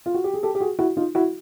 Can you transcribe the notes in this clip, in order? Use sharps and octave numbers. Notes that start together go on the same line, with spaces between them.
F4
F#4
G4
G#4
G4 A4
G4
F#4 G#4
E4 F#4
D#4 F4
E4 F#4